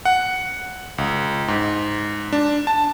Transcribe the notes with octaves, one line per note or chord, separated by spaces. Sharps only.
F#5
C#2
G#2
D4
A5